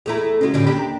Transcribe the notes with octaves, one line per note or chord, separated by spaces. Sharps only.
E2 A3 E4 G#4 A#5
C#3 G#3 C#4 F#4
A2 D3 G3 C#4 D4
D#2 D4 G4 B5
A#5